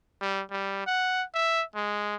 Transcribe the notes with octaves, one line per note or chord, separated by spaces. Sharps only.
G3
G3
F#5
E5
G#3